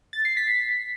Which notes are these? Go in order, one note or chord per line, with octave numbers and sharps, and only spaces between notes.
A6
C7
B6